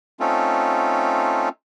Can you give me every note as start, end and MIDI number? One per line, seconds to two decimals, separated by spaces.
0.20 1.49 57
0.20 1.49 60
0.20 1.49 61
0.20 1.49 63
0.20 1.49 65
0.20 1.49 69